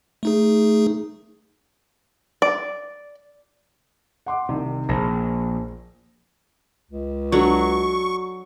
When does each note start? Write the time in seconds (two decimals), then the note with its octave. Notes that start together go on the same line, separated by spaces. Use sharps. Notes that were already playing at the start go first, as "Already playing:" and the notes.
0.23 A3 D#4 G#4
2.42 D5
4.26 F#5 C6 D6
4.49 C2 C3 D#3
4.89 A#1 G#4 C5 A#6
6.91 C#2
7.32 F#3 D4 A4 D5 C#6